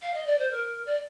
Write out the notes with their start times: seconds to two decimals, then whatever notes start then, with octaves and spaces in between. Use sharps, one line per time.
0.01 F5
0.13 D#5
0.26 D5
0.38 C5
0.50 A#4
0.86 D5